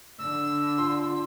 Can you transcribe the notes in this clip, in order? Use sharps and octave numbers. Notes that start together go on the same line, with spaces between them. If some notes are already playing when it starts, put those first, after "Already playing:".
D3 E6
F4 C6